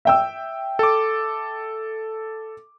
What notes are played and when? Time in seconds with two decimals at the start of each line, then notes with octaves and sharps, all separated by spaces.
0.05 E5 G5 E6
0.79 A4 D6